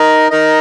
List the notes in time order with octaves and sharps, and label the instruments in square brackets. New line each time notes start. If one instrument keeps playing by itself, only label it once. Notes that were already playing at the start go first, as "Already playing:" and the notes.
Already playing: [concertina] D#4 A#4 D#5
D#4 A#4 D#5